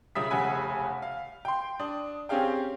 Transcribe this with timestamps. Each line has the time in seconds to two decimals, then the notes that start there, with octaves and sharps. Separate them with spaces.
0.15 C#2 C#3 E5 D#6 E6 B6
0.30 F1 C#3 F#5 G#5 B5
1.02 F5
1.45 G5 C6
1.80 D4 D#6
2.29 C4 C#4 G4 G#4 F5 G5